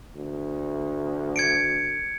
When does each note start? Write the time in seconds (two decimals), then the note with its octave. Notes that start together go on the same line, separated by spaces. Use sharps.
0.16 D2
1.36 G#6 C#7 D7